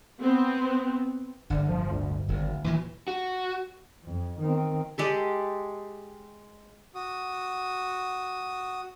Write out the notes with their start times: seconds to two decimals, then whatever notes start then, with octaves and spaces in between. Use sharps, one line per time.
0.20 B3 C4
1.50 D1 G1 D3
1.69 F3
1.91 D2
2.28 D1 G#1
2.64 D#2 A#2 E3 F#3
3.08 F#4
4.05 F2
4.40 D#3 C4
4.98 G#3 G4 A4
6.95 F#4 D#6